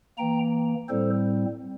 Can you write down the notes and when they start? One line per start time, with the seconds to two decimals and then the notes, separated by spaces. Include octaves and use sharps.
0.18 E3 A#3 G5 A#5
0.88 A2 G3 C4 A4 C5